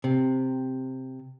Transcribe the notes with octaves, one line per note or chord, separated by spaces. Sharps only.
C3